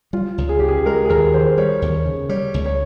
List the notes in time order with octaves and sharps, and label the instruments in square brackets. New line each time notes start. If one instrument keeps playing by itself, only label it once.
[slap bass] G3 [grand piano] F4
[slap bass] C#2
[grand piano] G#4
[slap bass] C#3 [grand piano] G4
[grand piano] G#4
[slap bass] G#3 [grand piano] A#4
[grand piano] G#4
[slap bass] D#2 [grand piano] A#4
[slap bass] D#3 [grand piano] C5
[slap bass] G3 [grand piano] C#5
[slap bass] D#2
C#3
[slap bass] G3 [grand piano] C#5
[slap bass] C#2
[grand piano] C#5